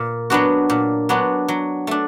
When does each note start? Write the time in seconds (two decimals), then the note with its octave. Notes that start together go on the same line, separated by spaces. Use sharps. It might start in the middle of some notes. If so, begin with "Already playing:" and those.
Already playing: A#2
0.30 F#3 B3 D4 F#4
0.70 A#2
1.09 F#3 B3 D4 F#4
1.48 F#3
1.87 A3 D4